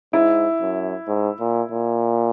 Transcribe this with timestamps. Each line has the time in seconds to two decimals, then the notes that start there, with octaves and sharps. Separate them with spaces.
0.13 G#2 E4
0.61 F#2
1.07 G#2
1.40 A#2
1.71 A#2